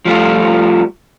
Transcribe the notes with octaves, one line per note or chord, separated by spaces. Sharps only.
F3 G3 A3 F4